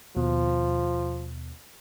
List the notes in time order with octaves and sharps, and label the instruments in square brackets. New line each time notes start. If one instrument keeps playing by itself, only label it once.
[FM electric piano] D#2 B2 [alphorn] F3